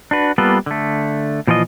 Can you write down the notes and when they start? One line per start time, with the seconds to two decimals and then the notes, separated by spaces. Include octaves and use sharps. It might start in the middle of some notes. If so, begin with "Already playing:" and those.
0.11 D4 F#4 B4
0.38 G3 A#3 B3 F4 A4 B4
0.66 D3 A3
1.47 A#2 E3 F3 F4 D#5